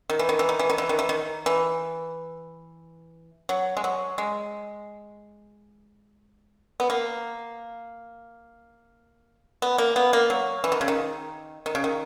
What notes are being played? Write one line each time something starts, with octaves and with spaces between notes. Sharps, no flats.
D#3
E3
D#3
E3
D#3
E3
D#3
E3
D#3
E3
D#3
E3
F#3
G#3
F#3
G#3
B3
A#3
B3
A#3
B3
A#3
F#3
E3
D#3
C#3
D#3
D#3
C#3
D#3